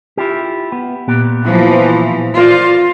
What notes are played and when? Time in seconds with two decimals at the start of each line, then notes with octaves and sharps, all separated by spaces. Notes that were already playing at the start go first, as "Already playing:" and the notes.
0.17 E4 F4 G4
0.72 B3
1.08 A#2 B3 G4
1.44 E3 F3
2.37 F4 A#4 C5 D5